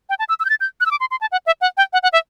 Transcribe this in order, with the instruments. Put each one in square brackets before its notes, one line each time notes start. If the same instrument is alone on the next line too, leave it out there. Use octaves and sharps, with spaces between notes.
[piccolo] G5
A5
E6
E6
G6
A6
G6
F#6
E6
D6
C6
C6
A5
F#5
E5
F#5
G5
F#5
F#5
E5